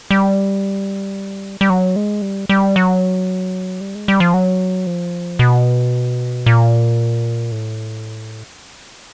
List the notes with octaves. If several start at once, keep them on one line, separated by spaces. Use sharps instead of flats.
G3
G3
F#3
G#3
G3
G3
F#3
G3
G#3
G3
F3
F#3
F3
B2
A#2
A2